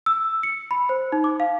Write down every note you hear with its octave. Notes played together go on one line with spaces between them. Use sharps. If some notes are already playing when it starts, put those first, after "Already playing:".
E6
C#7
B5
C5
D#4
D6
F5